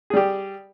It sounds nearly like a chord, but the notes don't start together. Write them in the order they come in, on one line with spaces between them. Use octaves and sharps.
G#4 G3 G4